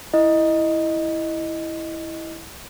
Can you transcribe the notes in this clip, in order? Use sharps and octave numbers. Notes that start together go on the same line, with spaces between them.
E4 D#5